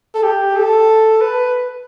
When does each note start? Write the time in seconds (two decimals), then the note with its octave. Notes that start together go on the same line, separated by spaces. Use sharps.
0.15 A4
0.23 G4
0.56 A4
1.21 B4